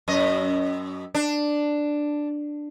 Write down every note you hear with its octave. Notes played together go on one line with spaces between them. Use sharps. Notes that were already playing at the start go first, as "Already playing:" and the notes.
F#2 D#5
D4